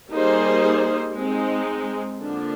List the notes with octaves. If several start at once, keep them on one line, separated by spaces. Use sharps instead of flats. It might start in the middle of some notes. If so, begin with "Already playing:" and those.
G3 A#3 D#4 G#4 C5
G#3 C4 D#4
D3 F3 A#3 D4